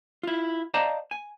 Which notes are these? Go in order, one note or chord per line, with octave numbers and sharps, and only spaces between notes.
E4 F4
C5 D5 D#5 F5 A5 A#5
G#5